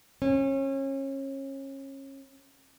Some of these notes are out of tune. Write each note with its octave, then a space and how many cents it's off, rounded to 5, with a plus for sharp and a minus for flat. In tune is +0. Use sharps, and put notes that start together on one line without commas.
C#4 -30